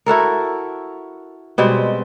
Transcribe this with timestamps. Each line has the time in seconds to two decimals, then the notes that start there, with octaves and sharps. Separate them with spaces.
0.06 E4 F#4 A4 A#4
1.58 B2 G3 G#3 C4